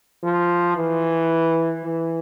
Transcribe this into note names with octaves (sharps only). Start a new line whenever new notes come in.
F3
E3
E3